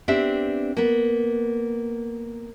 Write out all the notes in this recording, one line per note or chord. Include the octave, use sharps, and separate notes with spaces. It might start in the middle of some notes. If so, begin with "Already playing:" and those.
B3 C4 D4 G4 E5
A#3 B3